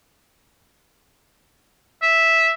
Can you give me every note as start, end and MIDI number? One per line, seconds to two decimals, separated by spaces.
2.02 2.50 76